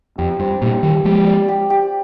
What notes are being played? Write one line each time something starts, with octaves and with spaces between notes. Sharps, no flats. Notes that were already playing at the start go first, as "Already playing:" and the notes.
F2 G4
G2 C4
G2 A#2 G4
D#3 G3 G4
F3 G#3 G4
D5
G4
G4